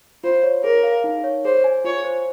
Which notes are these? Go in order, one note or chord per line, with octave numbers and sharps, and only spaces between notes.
F4 C5
C#5
G#4 A#4
F5
D#4
C#5
G#4 C5
G#5
F4 C#5
C5